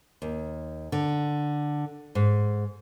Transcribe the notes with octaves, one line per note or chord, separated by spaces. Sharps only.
D#2
D3
G#2